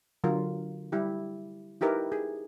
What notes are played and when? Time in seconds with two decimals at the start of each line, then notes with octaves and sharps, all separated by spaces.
0.24 D3 F#3 F4 A#4
0.92 G3 E4 G4
1.81 D#4 E4 G4 A#4 B4
2.12 G#4